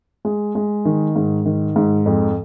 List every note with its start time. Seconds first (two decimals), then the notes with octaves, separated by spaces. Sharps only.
0.25 G#3
0.55 G#3
0.85 D#3
1.16 G#2
1.46 D#3
1.76 G#2
2.06 F2